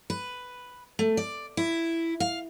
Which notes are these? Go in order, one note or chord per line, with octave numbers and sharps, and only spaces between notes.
B4
A3
D5
E4
F5